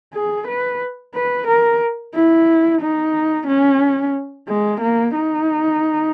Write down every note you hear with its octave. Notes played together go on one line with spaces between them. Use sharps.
G#4
B4
B4
A#4
E4
D#4
C#4
G#3
A#3
D#4